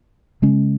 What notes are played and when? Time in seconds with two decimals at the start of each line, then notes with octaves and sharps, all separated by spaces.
0.42 C#3 G#3 C#4